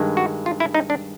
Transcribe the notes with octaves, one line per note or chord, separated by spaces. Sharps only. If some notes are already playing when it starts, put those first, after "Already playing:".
Already playing: G2 D#3 G#3
F#4
F4
E4
D#4
D4